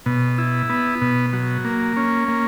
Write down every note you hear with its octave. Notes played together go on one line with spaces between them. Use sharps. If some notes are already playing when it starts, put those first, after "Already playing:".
B2
E4
B3
B2
F#3
A#3
C#4
A#3